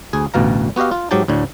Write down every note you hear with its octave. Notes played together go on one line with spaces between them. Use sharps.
D2 G#4 G#5
A1 D2 B2 F5 A#5
B3 F#4 G4 D#5 F5
F4
G#2 F#3 G4 G5 A5
D2 A2 D3